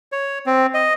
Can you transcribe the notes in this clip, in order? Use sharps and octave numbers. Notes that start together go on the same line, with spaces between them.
C#5
C4
D#5